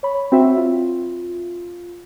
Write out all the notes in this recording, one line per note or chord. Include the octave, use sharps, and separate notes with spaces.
C#5 B5
C4 F#4 E5
F4